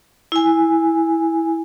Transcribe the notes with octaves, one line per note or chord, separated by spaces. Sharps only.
E4 G#5